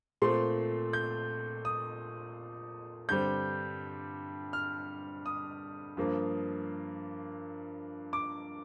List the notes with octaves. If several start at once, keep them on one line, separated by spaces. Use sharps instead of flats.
A#2 A3 C4 C6
G6
D#6
G2 D3 G3 C4 G6
F6
D#6
G2 F3 A#3
D6